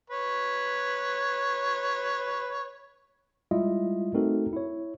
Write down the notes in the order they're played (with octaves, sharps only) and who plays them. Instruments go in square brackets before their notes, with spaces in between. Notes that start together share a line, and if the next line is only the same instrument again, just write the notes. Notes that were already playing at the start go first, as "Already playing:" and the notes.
[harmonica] B4 C#5
[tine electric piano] G3 G#3 E4 F4 D#5 E5
A3 C4 D#4 F#4 A4 A#4
E4 C#5